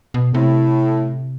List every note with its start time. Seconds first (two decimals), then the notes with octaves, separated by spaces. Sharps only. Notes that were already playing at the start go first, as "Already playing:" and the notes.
0.14 B2
0.34 A2 C3